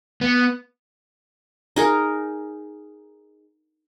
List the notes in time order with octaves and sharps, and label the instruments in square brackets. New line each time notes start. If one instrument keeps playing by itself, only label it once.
[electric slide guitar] B3
[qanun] D#4 G#4 A#4